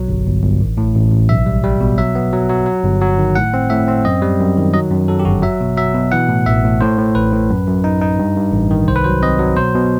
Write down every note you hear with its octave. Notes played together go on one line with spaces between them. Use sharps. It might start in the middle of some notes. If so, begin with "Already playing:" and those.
Already playing: B1 F#3
G1
G1
G1
A1
A2
A1
A1
B1 E5
G3
G3
B2
F#3 E5
B3
F#3
F#3
F#3
G1
F#3
D#3
A2 F#5
C4
A2 E5
C4
F#2 D#5
G3
F#2
D#3
F#3 D#5
F#2
F#3 A4
G4
G1 F#4
F#3 E5
B2
F#3 E5
B2
E3 F#5
A2
A1 E5
A2
A2 C5
A2
A1 B4
A2
F#2
F#2
D#4
D#4
G2
G2
A1
D#3
C2 C5
B4
F#3 C5
C4 D#5
F#3
B2 C5
B2